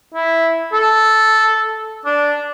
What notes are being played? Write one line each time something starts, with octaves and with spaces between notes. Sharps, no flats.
E4
A4
D4